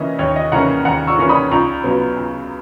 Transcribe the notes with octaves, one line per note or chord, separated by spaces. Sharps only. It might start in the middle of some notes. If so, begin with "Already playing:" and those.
Already playing: C#3 E3 A#3 C#4 D#5 E5
D#2 C#5
D#5
C#3 E3 A#3 C#4 F#5 A#5
D#2 F#5 A#5
C#6 E6
C#3 E3 A#3 C#4
B5 D#6
C#2 A#5 C#6
C#3 F#3 B3
C#2